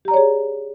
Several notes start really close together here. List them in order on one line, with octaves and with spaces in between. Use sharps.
G4 A#5 D5 C#5 G#4